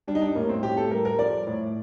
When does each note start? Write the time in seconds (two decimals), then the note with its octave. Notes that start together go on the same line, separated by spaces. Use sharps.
0.08 G3 D4
0.15 D#4
0.21 D4
0.35 A2 A#3
0.49 C4
0.63 A2 G4
0.77 A4
0.91 G3 A#4
1.05 A#4
1.19 F3 D5
1.47 A2